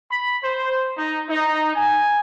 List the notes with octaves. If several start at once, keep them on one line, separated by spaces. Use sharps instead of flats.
B5
C5
D#4
D#4
G#5